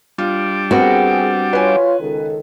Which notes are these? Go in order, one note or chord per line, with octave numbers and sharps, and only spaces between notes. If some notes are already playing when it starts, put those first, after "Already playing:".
G3 D4 F4
B3 C4 F#4 G#4 A#4 G5
F4 B4 C#5 G#5
C#2 D#3 A4